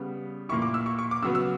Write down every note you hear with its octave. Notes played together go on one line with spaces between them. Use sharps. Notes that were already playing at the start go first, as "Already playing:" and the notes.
Already playing: C#3 G3 B3
A#2 A#3 E4 C#6
D6
E6
C#6
C#6
D6
C#3 F#3 B3 E6
E6